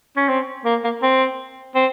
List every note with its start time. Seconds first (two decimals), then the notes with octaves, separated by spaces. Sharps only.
0.17 C#4
0.29 C4
0.65 A#3
0.84 A#3
1.02 C4
1.75 C4